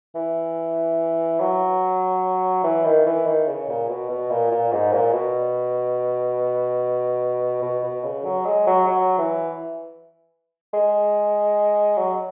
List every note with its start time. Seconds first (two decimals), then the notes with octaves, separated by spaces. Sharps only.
0.15 E3
1.40 F#3
2.64 E3
2.85 D#3
3.06 E3
3.26 D#3
3.48 C#3
3.69 A#2
3.89 B2
4.09 B2
4.30 A#2
4.51 A#2
4.72 G#2
4.92 A#2
5.13 B2
7.62 B2
7.83 B2
8.04 C#3
8.25 F#3
8.45 G#3
8.67 F#3
8.87 F#3
9.18 E3
10.73 G#3
11.98 F#3